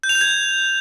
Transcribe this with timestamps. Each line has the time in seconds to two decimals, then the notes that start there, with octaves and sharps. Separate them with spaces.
0.03 G6
0.09 F7
0.15 G6
0.21 G#6